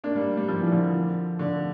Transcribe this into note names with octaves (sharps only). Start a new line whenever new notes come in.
A#3 D4
G3 A#3
G3
F3
E3
D3 F3
D3